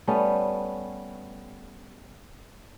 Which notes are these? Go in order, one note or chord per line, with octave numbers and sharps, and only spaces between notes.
G3 A3 B3 C#4